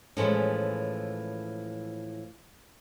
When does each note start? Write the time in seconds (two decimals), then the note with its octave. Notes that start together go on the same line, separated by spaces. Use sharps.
0.17 A2 E3 F3 G#3 C#4